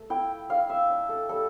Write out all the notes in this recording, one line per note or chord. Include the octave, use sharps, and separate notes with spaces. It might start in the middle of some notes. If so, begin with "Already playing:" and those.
Already playing: A3
E4 G5
D4 F5
E5
D4
A4
G3 A4